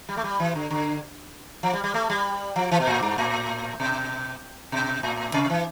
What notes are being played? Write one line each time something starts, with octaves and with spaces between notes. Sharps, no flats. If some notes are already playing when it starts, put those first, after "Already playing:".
G3
A3
G3
E3
D3
D3
F3
G3
G3
A3
G3
F3
E3
B2
A2
G2
A2
B2
B2
A2
C3
E3